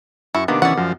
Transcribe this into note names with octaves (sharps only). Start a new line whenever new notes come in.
F#2 E4 C#6
C3 D#3 A#3 B3 D4
E3 C#4 D5 F#5
F#2 F3